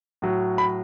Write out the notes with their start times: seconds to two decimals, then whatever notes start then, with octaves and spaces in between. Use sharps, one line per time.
0.22 A2 F#3
0.58 B5